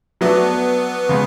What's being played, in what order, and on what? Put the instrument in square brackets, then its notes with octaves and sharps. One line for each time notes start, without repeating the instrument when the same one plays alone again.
[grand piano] F#3 A3 D4 [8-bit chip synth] B3
[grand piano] C#3 G#3